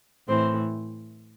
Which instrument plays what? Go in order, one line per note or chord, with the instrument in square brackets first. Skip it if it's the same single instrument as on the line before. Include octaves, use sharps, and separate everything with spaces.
[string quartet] A2 E3 C4 C5